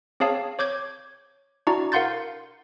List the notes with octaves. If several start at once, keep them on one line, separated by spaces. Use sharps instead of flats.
C4 G#4 C#5 F5 A5 D#6
C#5 D6 G6 G#6
D4 E4 F#4 D5 A#5
A#4 F5 F#5 C6 G6 A6